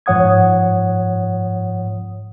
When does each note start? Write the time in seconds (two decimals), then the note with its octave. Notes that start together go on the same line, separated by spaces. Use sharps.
0.06 G#2 F3 C#5 F#5 D#6 G#6